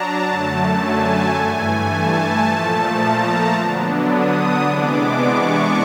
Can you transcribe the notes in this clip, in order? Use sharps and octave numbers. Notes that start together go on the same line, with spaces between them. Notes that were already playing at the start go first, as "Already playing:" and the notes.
Already playing: F#3 D4 A5 A#5
F#2 D3 F#3 A3
G#5
G2 E3 A3 G#5
A5
A#2 F3 A3
A#5
D3 F#3 B3 D4
D#6
C3 E3 G#3 B3 D4 D6
C#6